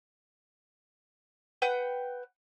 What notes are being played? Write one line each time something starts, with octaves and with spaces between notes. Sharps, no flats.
B4 F#5 G5 G6